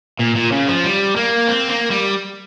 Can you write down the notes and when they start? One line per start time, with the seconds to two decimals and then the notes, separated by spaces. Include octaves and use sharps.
0.20 A#2
0.36 A#2
0.52 C#3
0.68 F3
0.84 G3
1.16 A#3
1.48 C4
1.69 A#3
1.91 G3